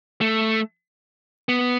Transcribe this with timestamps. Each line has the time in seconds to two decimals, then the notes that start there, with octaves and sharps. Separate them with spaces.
0.21 A3
1.49 B3